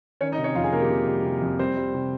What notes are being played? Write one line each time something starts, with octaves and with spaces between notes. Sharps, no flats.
D#3 C#4 C#5
D#4 D#5
C3
C#4 C#5
F2 F4 F5
G#4 G#5
C3 A#3 A#4
G4
C3
G3
C3
F2
G3 C4 C5
G3
C3